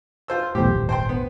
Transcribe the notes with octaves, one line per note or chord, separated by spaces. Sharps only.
F4 C5 E6
B1 E2 A2 G4 C5
D#1 G#1
C5 G5 C6
B3